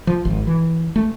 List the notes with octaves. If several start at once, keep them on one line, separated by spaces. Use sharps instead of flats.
F3
G#1
E3
A3